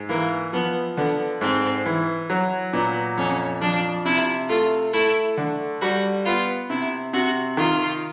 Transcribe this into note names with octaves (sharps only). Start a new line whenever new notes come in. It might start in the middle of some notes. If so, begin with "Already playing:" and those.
Already playing: G#2
E3 A#3
F3 B3
D3 B3
G#2 C4
E3
F#3
A#2 B3
F2 C#4
F3 D4
C3 E4
A3 F4
A3 E4
D3
G3 F#4
B3 F4
C3 E4
C3 F#4
D#3 F4